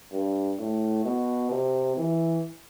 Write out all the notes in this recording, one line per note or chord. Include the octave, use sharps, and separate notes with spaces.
G2
A2
B2
C3
E3